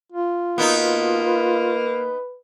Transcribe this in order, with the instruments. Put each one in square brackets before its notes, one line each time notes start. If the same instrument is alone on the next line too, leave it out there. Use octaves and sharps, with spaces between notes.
[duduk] F4
[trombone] B2 [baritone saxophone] A#3 [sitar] B3 D#4
[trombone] B4